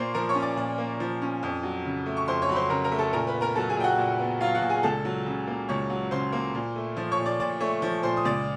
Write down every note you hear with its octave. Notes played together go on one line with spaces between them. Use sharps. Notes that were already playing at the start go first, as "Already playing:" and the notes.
Already playing: A#2 A#3 C5 D5 C6 C#6
F3 A#4 A#5
C#5 C#6
C#4
D5 D6
A#2 D5 D6
A#3
F3
C#4
F2
F#3
C#3
A3
C#6
F2 C5 C6
C#5 C#6
F#3 B5
C5 C6
C#3 A#4 A#5
A#4 A#5
A3
A4 A5
A#2 A#4 A#5
B4 B5
B3
A#4 A#5
F#3 A4 A5
G#4 G#5
A#2 G5
F#4 F#5
A#2
B3
F#3 F4 F5
F#4 F#5
A#2
G#4 G#5
C#2 A4 A5
F#3
C#3
A#3
C#2 C#5 C#6
F#3
C#3 C5 C6
A#3
A#2
A3
F3
C#5 C#6
A#2
D5 D6
A#2 D5 D6
A3 C#5 C#6
F3
A#2 C5 C6
D#6
C#2 D5 D6